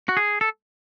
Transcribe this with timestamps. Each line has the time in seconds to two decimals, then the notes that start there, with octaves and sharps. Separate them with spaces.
0.09 F#4
0.17 G#4
0.41 A4